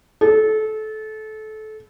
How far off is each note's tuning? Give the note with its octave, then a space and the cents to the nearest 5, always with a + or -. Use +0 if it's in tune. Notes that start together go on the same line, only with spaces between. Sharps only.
A4 -25